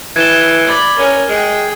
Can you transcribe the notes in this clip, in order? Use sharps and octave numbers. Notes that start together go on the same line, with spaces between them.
E3 A5 G#6 G7
D5 B5
C#4 A#4 G#5
G#3 G#4 G5